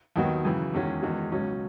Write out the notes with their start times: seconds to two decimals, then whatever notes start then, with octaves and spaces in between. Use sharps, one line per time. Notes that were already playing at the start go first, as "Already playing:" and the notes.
0.16 D#2 D#3 F#3 B3 F#4
0.45 F#2 C#3 E3
0.74 E2 D#3 G#3 C#4 F#4
1.02 E2 D#3 G#3 D#4 F#4
1.31 C#2 B2 F#3 C#4